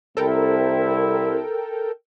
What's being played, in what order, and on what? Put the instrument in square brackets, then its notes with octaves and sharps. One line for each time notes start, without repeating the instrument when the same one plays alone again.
[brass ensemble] C2 C4 E4 [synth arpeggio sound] A4 A#4 G5